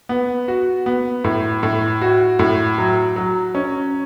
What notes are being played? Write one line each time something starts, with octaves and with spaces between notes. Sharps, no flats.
B3
F#4
B3
A2
A2
F#4
A2
F#3
F#3
C#4